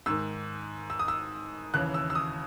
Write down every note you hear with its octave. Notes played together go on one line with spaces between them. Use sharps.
G#2 D#3 E6
E6
D#6
E6
D#2 C#3 E3 F#6
E6
E6
D#6